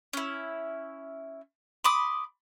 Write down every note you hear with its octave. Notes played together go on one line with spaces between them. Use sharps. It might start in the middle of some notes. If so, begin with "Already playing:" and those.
C#4 E4
B5 C6 D6 D#6